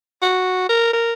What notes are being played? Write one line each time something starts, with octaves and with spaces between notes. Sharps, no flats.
F#4
A#4
A#4